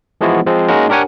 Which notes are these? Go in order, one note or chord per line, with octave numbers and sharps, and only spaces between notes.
E3 F3 G#3 B3 E4 F#4
F3 G#3 C4
G#3 A#3 C#4 D#4 F#4
D4 G4 A#4 C#5 F#5 G#5